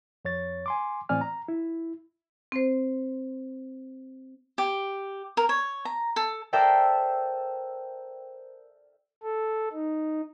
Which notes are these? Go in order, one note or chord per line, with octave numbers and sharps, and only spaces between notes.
F2 C#5 A6
G#5 C6 D6
A2 E3 C4 D5 G#5 F6
A#5
E4
C4 C5
G4
A#4
C#5
A#5
A4
A4 A#4 C5 D5 E5 G5
A4
D#4